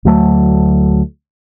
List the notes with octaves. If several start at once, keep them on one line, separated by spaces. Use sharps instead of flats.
D2 F#3 A3